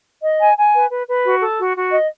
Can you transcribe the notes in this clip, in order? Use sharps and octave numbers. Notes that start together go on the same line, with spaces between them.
D#5
G#5
G#5
B4
B4
B4
F#4
A4
F#4
F#4
D#5